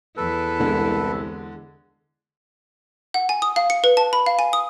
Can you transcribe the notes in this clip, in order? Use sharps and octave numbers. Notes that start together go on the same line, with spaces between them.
E2 E4 A4 B4
C2 D3 G#3
F#5
G#5
D#6
F5
C#7
B4
A5
B5
F5
G#5
D#6